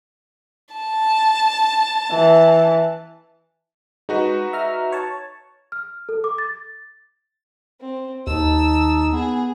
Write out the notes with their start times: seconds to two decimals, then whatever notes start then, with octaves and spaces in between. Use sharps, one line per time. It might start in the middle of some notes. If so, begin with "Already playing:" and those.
0.75 A5
2.11 E3
4.09 G#3 D#4 F#4 B4
4.53 E5 A#5 F6
4.92 C#5 A5
5.72 F6
6.09 A4
6.24 D6
6.38 A6
7.80 C4
8.27 D#2 D#4 A5 E6
9.12 B3 G#4